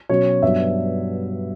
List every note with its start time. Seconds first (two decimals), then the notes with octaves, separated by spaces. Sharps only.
0.09 B2 F#3 C#4 C#5
0.42 G2 F#3 B3 D4 E5